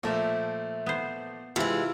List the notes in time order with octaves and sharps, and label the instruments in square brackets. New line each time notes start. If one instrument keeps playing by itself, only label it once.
[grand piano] A#2 F3 A3 [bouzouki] A#4 E5
[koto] B3 C5
[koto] C3 [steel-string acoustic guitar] E3 G#3 [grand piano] E4 F4